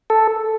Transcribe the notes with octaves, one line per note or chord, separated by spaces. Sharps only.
A4